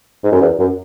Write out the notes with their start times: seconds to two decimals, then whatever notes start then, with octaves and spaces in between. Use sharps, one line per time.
0.24 G#2
0.32 F#2
0.41 E2
0.59 F#2